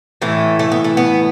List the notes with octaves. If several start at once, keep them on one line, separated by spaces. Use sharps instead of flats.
A2 E3 A3
A3
B3
A3
B3